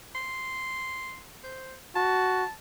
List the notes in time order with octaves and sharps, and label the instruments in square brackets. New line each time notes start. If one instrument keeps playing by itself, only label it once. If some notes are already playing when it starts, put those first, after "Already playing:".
[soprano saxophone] C6
C5
[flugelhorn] F#4 [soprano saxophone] A5